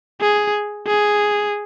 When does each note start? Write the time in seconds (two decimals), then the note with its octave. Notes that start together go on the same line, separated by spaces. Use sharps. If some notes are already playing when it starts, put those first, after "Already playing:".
0.21 G#4
0.87 G#4